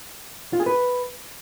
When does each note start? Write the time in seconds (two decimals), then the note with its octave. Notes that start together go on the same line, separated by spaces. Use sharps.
0.53 F4
0.60 G#4
0.66 B4